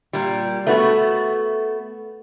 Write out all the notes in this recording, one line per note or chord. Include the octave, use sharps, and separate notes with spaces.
A#2 G3
A3 B3 F#4